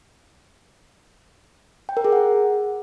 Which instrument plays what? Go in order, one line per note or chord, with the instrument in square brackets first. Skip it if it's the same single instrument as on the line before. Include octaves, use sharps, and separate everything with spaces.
[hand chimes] G5
A#4
G#4
F#5